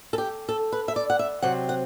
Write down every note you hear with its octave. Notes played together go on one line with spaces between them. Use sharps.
A4
G4
A4
B4
E5
D5
F#5
E5
C3 F#3 C4 F#5
F#5